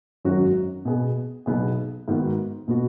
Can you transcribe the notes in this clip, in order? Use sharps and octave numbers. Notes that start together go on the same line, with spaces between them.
G#1 F#2 F#3 C#4 F#4
B2 B3 G#4
B1 B2 B3 G#4
G#2 D#3 B3 F#4
B2 B3 F#4